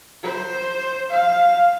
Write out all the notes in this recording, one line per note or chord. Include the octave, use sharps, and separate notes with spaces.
C5
F5